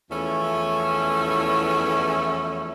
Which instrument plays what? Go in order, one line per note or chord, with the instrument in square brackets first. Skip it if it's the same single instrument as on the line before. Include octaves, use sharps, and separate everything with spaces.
[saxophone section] E2 F3 A3 C#4 E4 E5